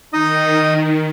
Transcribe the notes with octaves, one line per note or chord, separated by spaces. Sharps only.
D#3 D#4 D#5 D#6